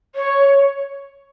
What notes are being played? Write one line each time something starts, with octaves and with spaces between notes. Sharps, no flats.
C#5